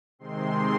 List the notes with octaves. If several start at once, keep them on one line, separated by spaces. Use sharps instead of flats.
C3 D#3 G#3 C4 C6